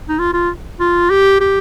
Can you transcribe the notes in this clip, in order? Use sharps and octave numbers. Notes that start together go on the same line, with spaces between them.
D#4
F4
F4
F4
G4
G4